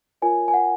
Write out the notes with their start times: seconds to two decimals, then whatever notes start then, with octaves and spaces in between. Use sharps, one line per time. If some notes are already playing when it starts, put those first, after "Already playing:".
0.22 F4 A#4 C#5 G#5
0.48 G#5
0.54 F#5